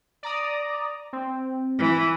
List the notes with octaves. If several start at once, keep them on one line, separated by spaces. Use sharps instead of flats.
D5 A#5 D#6
C4
E3